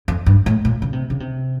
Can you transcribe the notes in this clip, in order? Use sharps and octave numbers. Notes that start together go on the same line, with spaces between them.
F2
G2
A2
A#2
C#3
C3
C#3
C3